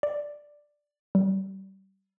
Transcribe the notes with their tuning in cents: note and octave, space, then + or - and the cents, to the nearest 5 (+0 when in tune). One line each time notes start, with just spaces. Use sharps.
D5 +5
G3 -30